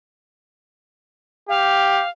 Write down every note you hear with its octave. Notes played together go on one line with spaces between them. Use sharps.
G4 F5